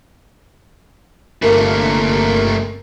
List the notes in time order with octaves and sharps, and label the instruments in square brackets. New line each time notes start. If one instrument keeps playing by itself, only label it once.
[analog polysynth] G1 A#3 A#4 [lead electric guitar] C3 A3